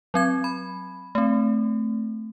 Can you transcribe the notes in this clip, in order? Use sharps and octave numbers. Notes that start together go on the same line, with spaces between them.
F#3 C4 G#6
B5
A3 C4